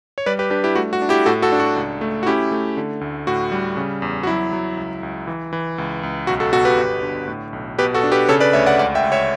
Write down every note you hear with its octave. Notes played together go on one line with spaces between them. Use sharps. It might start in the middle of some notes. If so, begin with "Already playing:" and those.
C#5
G3 B4 D5
G4 B4
D4 G4 B4
E4 G4
A3 F#4
F#4
D4
E4 G4
A2 F#4 A4
F#4 A4
D4
F#4
C#2
A3
F#4
C#4 E4 G4
A3
D3
D2
A2 F#4
G3
C#3
E2
F#4
F#3 E4
F#3
C#2
C#2
E3
E3
C#2
C#2
B1 F#4
F#4 A4
B2 F#4 A4
G4 B4
G1
D3
A2
B1
B2 G4 B4
F#4 A4
D4
G4 B4
C#3 A4 C#5
B4 D5
D2 C#5 E5
D5 F#5
C#2 D5 F#5
E5 G5
C#2
C#5 E5